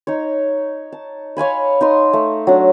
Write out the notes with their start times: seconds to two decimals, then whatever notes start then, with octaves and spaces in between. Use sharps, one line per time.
0.07 D#4 C#5
0.92 A5
1.37 C#5 F5 G#5 B5
1.81 D#4 C6 D#6
2.13 A3
2.47 F#3 D4